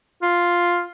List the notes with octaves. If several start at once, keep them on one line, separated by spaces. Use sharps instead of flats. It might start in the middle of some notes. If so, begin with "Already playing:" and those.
F4